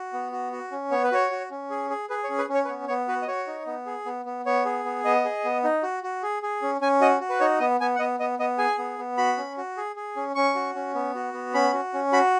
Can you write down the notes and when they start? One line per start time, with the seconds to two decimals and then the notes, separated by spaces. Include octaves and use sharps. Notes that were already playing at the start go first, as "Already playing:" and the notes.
Already playing: F#4
0.13 B3
0.32 F#4
0.52 F#4
0.71 C#4
0.91 B3 C#5
1.03 B4
1.12 F#4 C#5
1.31 F#4
1.51 C#4
1.70 G#4
1.90 G#4
2.10 G#4 B4
2.24 C#5
2.29 C#4
2.38 B4
2.49 C#4
2.54 C#5
2.65 B4
2.68 B3 C#5
2.88 B3 C#5
3.08 F#4 B4
3.22 D#5
3.28 F#4 C#5
3.47 D#4
3.66 B3
3.86 G#4
4.06 B3
4.25 B3
4.46 B3 C#5
4.65 G#4
4.85 B3
5.05 B3 D#5
5.25 G#4
5.44 B3
5.64 D#4
5.83 F#4
6.03 F#4
6.23 G#4
6.43 G#4
6.62 C#4
6.81 C#4 G#5
7.01 F#4 D#5
7.21 F#4
7.29 B4
7.40 D#4 C#5
7.60 B3 D#5
7.81 B3 G#5
7.95 F#5
7.99 B3 D#5
8.20 B3 D#5
8.39 B3 D#5
8.58 G#4 G#5
8.78 B3
8.99 B3
9.17 F#4 B5
9.38 C#4
9.57 F#4
9.77 G#4
9.96 G#4
10.16 C#4
10.35 C#4 C#6
10.55 F#4
10.75 C#4
10.95 B3
11.15 F#4
11.33 B3
11.54 C#4 B5
11.74 F#4
11.94 C#4
12.12 F#4 B5